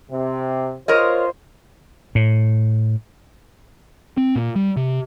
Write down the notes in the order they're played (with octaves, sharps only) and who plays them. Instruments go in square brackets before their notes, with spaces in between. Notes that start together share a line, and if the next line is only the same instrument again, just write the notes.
[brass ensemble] C3
[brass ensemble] F4 C5 [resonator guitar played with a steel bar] A#4 C#5 D#5
[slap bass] A2
[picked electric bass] C4
A#2
G3
C3